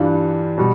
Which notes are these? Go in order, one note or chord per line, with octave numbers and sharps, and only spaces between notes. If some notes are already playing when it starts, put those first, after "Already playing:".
Already playing: G2 E3 G3 D4 F4
B2 G3